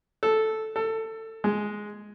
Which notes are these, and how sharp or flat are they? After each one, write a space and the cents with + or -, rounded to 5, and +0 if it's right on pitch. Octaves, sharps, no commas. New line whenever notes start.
A4 -5
A4 +20
G#3 +5